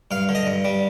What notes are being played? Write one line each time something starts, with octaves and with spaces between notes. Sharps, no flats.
G2 F5
D3
D#5
G2
G3